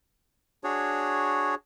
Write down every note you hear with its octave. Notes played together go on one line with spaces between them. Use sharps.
D4 F#4 G#4 C#5